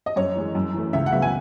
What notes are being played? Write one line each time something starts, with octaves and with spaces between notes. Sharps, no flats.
D#5
F#2 C#5
E3 G#3
F#2
E3 A3
C#2 E5
F#5
C#3 F#3 B3 E5
G#5